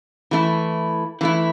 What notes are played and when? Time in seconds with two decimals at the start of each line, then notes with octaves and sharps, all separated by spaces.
0.31 E3 A3 E4
1.21 E3 A3 E4